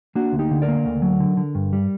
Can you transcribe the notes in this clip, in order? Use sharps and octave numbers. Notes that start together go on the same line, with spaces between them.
A#3 D4 F#4
D2
D#4 G4
D3
A#4 D5
A#3
D2
F#3
D3
D3
G2
G3